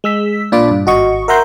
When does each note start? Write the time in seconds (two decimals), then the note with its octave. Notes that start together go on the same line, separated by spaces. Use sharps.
0.04 G#3 E6 B6
0.52 A#2 D4 F4 D5 B5 D6
0.71 G2
0.86 G#1 F#4 D#5 C#6
1.28 A#4 E5 F#5 A#5 C6 G6